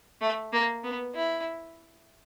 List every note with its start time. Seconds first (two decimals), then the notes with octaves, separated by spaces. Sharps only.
0.21 A3
0.53 A#3
0.84 B3
1.15 E4